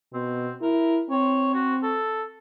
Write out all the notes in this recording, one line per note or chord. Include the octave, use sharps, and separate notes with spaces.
B2 C4
E4 A#4
C4 C#5
F#4
A4